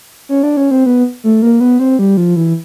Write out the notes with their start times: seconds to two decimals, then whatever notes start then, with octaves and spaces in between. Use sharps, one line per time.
0.29 C#4
0.43 D4
0.57 C#4
0.71 C4
0.86 B3
1.24 A3
1.42 A#3
1.60 B3
1.79 C4
1.99 G3
2.17 F3
2.36 E3